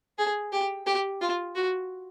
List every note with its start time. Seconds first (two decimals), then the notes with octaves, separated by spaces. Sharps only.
0.18 G#4
0.52 G4
0.86 G4
1.21 F4
1.55 F#4